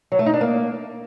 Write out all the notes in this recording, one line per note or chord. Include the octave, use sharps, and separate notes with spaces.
F#3
A3
D#4
D4
A#3